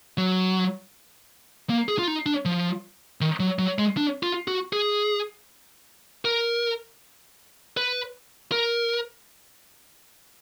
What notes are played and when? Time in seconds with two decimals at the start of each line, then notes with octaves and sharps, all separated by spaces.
0.18 F#3
1.70 A#3
1.88 G#4
1.99 F4
2.08 D#4
2.26 D4
2.45 F3
3.21 D#3
3.40 F#3
3.59 F#3
3.79 G#3
3.97 D4
4.23 F4
4.48 F#4
4.73 G#4
6.25 A#4
7.77 B4
8.52 A#4